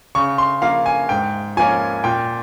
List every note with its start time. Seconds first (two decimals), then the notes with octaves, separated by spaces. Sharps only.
0.15 C#3 C#6
0.38 C6
0.62 F3 A#3 F5
0.86 G#5
1.09 G#2 G5
1.57 F3 A#3 C#4 G#5
2.04 A#2 G5